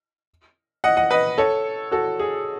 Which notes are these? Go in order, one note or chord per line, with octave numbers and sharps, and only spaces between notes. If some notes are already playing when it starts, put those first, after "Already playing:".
D#5 F#5
D#5 F#5
B4 D#5
A4 C#5
F#4 A4
G#4